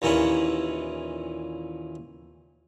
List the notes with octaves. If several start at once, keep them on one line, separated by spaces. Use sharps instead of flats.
D#2 A#2 E3 C#4 E4